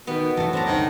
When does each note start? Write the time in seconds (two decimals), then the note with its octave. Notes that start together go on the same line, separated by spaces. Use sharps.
0.07 B2 D#3 B3 G5
0.37 F#2 E3 F#3 A3 A5
0.53 C4 D4 A#5
0.66 G#1 C#2 F#2 D#3